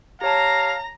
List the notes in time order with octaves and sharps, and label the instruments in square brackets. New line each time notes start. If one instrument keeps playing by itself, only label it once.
[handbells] G4 C#5 A5 [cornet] F5 [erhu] A#5